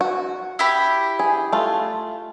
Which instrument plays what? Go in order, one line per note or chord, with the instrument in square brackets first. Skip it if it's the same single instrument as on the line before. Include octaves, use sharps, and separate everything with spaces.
[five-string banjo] F#4
[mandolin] E4 G4 B5
[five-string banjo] G#4
A3 F4